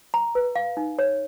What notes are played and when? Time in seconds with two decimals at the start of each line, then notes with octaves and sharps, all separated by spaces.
0.14 A#5
0.35 B4
0.56 F5
0.77 D#4
0.99 C#5